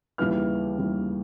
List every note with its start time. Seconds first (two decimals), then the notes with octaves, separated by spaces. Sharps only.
0.18 D#2 C#3 E3 G3 F6
0.78 D#2 C#3 E3 G3